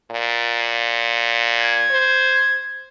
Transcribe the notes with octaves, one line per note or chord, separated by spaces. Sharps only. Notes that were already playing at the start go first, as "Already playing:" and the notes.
A#2
G#6
C5